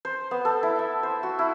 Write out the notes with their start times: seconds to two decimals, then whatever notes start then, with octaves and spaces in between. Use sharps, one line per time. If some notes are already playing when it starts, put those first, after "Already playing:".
0.05 C5
0.31 B3
0.45 A4
0.63 E4
0.79 E5
1.03 C5
1.23 F#4
1.39 E4